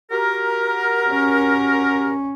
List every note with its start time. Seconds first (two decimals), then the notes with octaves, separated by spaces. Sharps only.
0.12 F#4 G4 A#4
1.09 C#4